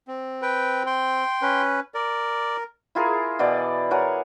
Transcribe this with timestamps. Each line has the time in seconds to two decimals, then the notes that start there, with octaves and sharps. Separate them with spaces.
0.08 C4
0.42 B4 G5
0.86 G5 C6
1.42 C#4 B4
1.94 A#4 D5
2.95 E4 F4 G#4 A#4
3.39 B2 E3 D5
3.91 A#4 C#5 F#5 G#5